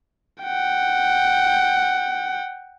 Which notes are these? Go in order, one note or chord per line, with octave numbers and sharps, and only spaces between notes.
F#5 G5